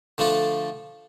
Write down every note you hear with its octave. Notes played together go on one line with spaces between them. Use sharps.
D3 F3 A3 D4 A4